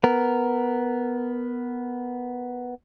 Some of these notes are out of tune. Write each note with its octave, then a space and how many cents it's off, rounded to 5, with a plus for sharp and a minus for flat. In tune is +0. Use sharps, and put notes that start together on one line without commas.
B3 +0 A#4 +0